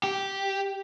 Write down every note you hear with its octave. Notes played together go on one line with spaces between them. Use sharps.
G4